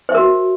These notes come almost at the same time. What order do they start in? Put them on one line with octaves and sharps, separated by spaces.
C5 E5 A#4 F#4